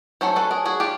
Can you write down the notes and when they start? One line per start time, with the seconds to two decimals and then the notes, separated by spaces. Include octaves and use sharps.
0.21 F#3 A3 C#4 C5
0.36 A4 B4
0.51 G#4 A#4
0.65 F#4 G#4
0.80 F4 G4